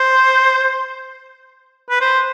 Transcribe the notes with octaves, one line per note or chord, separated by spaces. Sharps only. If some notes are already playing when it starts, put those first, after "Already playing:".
Already playing: C5
B4
C5